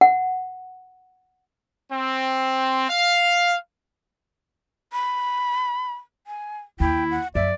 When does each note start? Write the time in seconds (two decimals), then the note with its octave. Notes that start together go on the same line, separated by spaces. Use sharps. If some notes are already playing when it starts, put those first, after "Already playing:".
0.01 F#5
1.92 C4
2.89 F5
4.93 B5
6.27 G#5
6.80 D#2 E4 G5
7.11 F#5
7.35 F#2 D5 E5